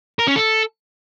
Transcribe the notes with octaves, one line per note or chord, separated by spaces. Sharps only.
A#4
C#4
A4